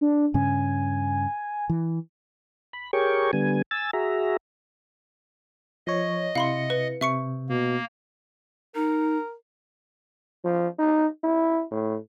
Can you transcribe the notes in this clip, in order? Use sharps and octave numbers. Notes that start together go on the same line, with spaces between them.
D4
G2 C#3 C#4 G#5
E3
B5
G4 G#4 A#4 C#5 G5 C#6
D3 G3 B3 G#5
G#5 E6 A6
F#4 G#4 E5 A#5
F3 C#5 D#5
C3 E4 F5 B5 C6 C#7
B4
C3 E5 C#6 C#7
B2 A#3
D#4 A#4
F3
D#4
E4
A2